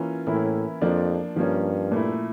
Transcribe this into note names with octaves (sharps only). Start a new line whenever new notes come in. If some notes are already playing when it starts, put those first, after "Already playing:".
Already playing: E3 A#3 C#4 F4
A2 E3 A#3 C#4 E4
F2 F3 A#3 D4 F4
G2 F3 A#3 C#4
A#2 A3 E4